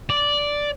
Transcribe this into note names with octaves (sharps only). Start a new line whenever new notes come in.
D5